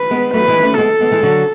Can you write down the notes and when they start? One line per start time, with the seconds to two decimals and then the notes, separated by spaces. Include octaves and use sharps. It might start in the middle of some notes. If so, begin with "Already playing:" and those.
Already playing: B4
0.11 G#3 B3
0.33 F#3 A3 B4
0.48 E3 G#3
0.63 A3 C#4
0.77 G#3 B3 A4
1.01 G#3 B3
1.11 E3 G#3
1.23 D3 F#3